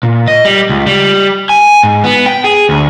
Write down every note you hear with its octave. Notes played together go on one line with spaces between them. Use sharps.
A#2
D#5
G3
C#2
G3
G#5
G#2
B3
G5
G#4
D2